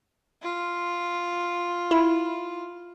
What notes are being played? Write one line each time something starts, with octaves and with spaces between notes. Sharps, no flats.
F4
E4